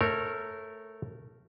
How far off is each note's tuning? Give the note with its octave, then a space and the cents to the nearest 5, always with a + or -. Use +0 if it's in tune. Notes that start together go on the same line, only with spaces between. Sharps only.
A3 +0 A#4 -15 C#5 -30